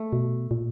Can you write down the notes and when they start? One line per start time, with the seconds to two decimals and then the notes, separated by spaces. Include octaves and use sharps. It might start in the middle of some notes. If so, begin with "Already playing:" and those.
Already playing: A3
0.13 B2
0.51 A#2